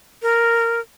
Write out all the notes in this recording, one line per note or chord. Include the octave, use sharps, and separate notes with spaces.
A#4